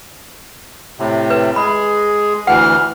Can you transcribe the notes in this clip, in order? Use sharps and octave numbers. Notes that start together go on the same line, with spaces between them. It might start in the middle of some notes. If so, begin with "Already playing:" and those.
A2 C3
B4
G#3 G#4 B5
D2 E3 F#5 G#5 F6